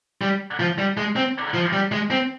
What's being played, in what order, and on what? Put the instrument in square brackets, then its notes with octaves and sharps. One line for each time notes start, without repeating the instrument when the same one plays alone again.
[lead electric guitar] G3
F3
G3
G#3
C4
F3
G3
G#3
C4